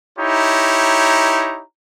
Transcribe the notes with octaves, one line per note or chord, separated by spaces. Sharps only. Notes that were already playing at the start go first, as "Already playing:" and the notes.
D#4 E4 G4 C#5 A#5